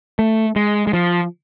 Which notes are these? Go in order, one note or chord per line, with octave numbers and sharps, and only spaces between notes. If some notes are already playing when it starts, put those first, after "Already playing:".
A3
G#3
G#3
F3